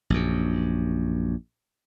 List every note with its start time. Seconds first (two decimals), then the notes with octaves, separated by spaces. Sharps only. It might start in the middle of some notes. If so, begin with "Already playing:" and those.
0.10 A#1 F#2